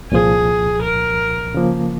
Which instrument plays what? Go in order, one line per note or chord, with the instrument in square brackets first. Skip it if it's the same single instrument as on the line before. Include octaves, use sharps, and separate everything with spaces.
[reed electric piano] C2 A#2 F3 [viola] G#4
[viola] A#4
[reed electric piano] C#3 F3 A#3